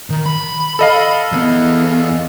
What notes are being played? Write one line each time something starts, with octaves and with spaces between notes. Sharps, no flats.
D#3
B5
A4 D#5 F5
E2 B3